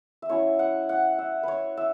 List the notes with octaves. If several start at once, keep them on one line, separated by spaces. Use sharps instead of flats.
E5
F#3 C#4 E4 C#5
F#5
F#5
E5
B4 C#5
E5